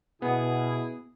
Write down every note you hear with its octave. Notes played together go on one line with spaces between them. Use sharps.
B2 B3 E4 G#4